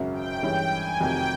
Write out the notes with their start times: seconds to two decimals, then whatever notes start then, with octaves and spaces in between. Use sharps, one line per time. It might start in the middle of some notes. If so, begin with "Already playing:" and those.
Already playing: G#1 F#2 C#3 F#3
0.13 G5
0.42 G2 E3 G#3 C#4 G5
0.72 G#5
1.00 F1 F2 C3 D#3 F#3 G5